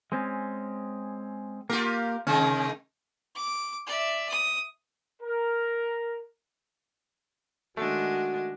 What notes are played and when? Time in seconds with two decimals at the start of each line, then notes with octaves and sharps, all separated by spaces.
0.12 G#3 C4 C#4
1.70 A#3 F4 G4 A#4
2.27 C3 D#3 G#3 C#4
3.35 D6
3.86 D5 E5
4.29 D#6
5.22 A#4
7.77 D#3 G#3 A3 D4 F#4